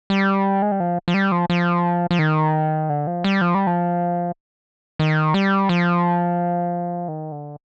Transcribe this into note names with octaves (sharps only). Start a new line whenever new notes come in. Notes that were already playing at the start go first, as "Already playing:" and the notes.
G3
G#3
G3
F3
F3
G3
F3
F3
F3
D#3
D3
F3
G3
F3
G3
F3
D#3
G3
F3
D#3
D3